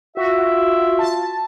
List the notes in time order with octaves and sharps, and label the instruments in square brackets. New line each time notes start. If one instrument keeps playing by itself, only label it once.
[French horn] F4 [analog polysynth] F#4 [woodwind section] E5
[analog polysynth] A5